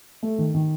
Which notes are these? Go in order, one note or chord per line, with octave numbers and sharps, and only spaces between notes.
A3
D#3
D#3